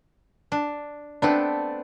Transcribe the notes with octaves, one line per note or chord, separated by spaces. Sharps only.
D4
A3 B3 C4 D4